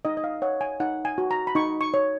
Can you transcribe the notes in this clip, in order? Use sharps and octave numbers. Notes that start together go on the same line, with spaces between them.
D#4 D#5
D#5
F5
C#5 F#5
G#5
D#4 F#5
G#5
F#4
A#5
B5
D#4 C#6
C#6
C#5